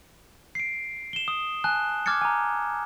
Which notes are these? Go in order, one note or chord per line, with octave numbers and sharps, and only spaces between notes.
C7 D7
E7 G7
D#6
G#5 A5 F#6
D6 F6 G#6 A6 C#7
G#5 A#5